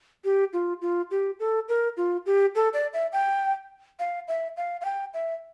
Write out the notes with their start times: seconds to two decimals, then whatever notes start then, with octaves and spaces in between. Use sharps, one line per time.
0.24 G4
0.53 F4
0.82 F4
1.11 G4
1.40 A4
1.69 A#4
1.97 F4
2.26 G4
2.55 A4
2.73 D5
2.93 E5
3.13 G5
3.99 F5
4.28 E5
4.57 F5
4.81 F5
4.85 G5
5.14 E5